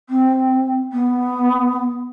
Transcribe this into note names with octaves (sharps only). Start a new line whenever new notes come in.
C4
B3